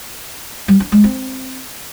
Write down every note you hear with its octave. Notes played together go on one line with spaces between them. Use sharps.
G3
D4
G#3
C4